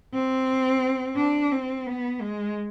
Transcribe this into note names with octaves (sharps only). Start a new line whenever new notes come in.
C4
D4
C4
B3
G#3